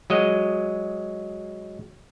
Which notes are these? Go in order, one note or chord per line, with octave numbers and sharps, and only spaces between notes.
F#3 G#3 D#5